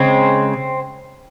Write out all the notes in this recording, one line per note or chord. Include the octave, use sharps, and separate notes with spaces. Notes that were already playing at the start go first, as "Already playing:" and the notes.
Already playing: C#3 G#3 C4